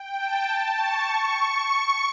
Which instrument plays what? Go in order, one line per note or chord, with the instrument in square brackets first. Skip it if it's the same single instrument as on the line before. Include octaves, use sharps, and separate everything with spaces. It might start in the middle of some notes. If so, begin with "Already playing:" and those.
Already playing: [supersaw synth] G5
A5
C#6
C#6